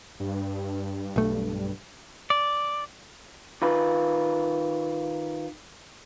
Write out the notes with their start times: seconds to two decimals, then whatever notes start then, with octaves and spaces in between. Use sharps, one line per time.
0.20 G2
1.16 B1 A3
2.30 D5
3.62 D#3 F4 B4